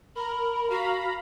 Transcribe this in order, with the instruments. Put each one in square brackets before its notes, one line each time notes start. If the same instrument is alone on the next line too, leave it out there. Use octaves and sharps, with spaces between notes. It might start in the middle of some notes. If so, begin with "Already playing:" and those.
[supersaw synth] A#4 [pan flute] B5
[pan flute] F#4 [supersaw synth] F5 A#5 B5